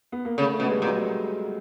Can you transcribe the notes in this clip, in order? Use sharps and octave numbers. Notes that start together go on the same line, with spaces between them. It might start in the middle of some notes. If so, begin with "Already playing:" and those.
B3
A#3
C#3 A3
A3
B2
G#3
G3
A#2
F#3